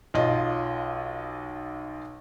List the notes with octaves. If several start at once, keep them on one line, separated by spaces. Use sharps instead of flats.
B1 F4 D#5